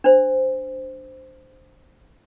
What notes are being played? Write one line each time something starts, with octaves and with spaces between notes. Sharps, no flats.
D4 C5